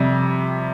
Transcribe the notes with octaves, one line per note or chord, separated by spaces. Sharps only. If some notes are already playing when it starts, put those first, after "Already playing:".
Already playing: F2 C3 G3